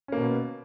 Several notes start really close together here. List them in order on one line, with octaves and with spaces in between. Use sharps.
C#4 A#3 B2 B3